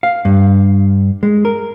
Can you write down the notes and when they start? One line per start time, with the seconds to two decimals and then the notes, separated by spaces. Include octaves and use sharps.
0.03 F5
0.25 G2
1.23 G#3
1.45 A#4